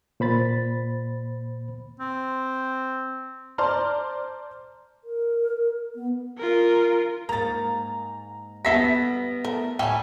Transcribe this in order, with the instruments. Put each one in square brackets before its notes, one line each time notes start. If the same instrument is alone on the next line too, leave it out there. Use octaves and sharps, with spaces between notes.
[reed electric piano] A#2 C5 B5 A6
[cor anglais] C4
[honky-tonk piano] C5 D5 A5 A#5 C6 F6
[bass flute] A#4
B3
[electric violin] F4 A#4
[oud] G#2 A#3 [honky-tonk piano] A#5 A6
[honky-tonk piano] G3 B3 [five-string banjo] A4 E5 B5 [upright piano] A#6 B6
[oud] A3 [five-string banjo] A#4
[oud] D2 A2 [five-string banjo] G3 A3 G5 [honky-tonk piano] G#5